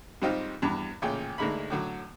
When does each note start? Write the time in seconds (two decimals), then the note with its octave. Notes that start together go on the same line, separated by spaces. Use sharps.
0.22 G#2 G3 C4 D#4 F4 G4
0.62 E2 G2
1.02 A1 A#2 C#3 G5 G#5
1.38 D2 G#2 G#3 A#3 B5
1.70 A2 D3 F#3